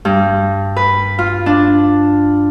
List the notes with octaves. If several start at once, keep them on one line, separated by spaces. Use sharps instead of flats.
G2
B4
F4
D4